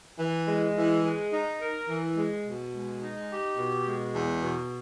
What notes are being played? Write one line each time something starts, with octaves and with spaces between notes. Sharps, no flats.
E3
G#3
E3
G#3
D#4
A#4
E3
G#3
B2
G#3
D#4
G4
B2
G#3
E2
B2